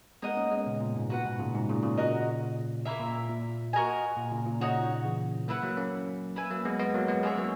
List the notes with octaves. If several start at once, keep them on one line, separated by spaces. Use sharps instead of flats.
G#3 B3 D#4 A#4 D#5 F#5
A#3 C#4
G#3 B3
A#2 C#3
A#2
G#2
A#2 F#4 B4 F#5
G#2 B2
A#2 C#3
G#2 B2
A#2 C#3
A#2 C#3
F#4 A#4 D#5
A#3 E4 A#4 E5
A#2
A#2
F#4 A#4 D#5 G#5
A#2
A#2 C#3
A#2
A#2 C#3 D#4 F#4 C#5
C#3 E3
F#3 A#3 E4 B4 F#5
F#3 A#3
A#3 C#4
E4 B4 E5 G#5
F#3 A#3
G#3 B3
G#3 B3
F#3 A#3
G#3 B3
G#3 B3 C#4 G#4 C#5 E5
F#3 A#3